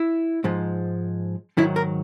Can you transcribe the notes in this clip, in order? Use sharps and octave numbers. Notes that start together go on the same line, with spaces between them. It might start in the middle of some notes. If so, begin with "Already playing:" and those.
Already playing: E4
G#2 F3 G#3
G#2 D#3 F#3 E4
A#4